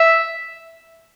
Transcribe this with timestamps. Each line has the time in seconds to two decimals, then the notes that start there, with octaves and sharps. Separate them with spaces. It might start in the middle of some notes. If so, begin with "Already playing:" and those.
Already playing: E5